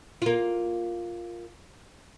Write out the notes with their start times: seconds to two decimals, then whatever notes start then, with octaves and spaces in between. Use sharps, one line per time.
0.22 A#3 F4